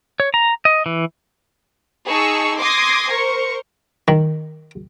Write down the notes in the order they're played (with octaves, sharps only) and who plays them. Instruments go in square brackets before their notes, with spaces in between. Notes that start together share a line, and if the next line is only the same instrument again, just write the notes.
[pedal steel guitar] C#5
A#5
D#5
E3
[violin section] D#4 G#4 A5 C#6 E6
C6 D6 D#6 G#6 A#6 C7
A#4 C5 C#6
[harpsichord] D#3